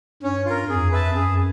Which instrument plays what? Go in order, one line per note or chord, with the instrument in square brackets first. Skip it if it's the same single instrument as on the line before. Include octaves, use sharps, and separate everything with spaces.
[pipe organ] G2 [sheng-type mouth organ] C#4
[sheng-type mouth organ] F4 A#4
[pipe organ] F2 [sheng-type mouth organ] G#4
[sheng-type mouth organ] B4 E5 A5
[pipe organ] F#2 [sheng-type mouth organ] G#4